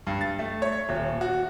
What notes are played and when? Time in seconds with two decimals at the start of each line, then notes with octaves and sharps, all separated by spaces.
0.07 G2
0.21 A6
0.39 A3
0.62 C#5
0.89 D#1
1.21 F#4